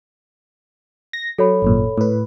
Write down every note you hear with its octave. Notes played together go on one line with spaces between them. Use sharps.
A#6
F#3 A4 C#5 B5
G#1 F#2 A#2
A2 B4